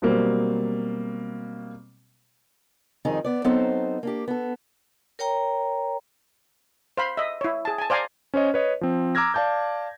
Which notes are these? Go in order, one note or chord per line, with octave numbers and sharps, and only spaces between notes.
B2 F#3 G3 A#3 C4
F2 D#3 G3 D#4 G#4
B3 D5
F#3 B3 C4 D#4 A4 C5
A#3 D4 G4
B3 A4
A#4 C#5 G5 A#5
C5 F5 B5
D#5 E5
E4 C#5
G#4 A5
G#5 A5
C5 D5 F5 G#5 A#5
C#4 C5 C#5 D#5
B4 C#5 D#5
F3 C4
A#5 D6 E6 F6 G#6 A#6
D5 F5 A5 D6 G6